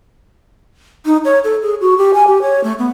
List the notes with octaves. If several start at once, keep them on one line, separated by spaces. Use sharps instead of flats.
D#4
C#5
A4
G#4
F#4
G4
G#5
G4
C#5
A3
B3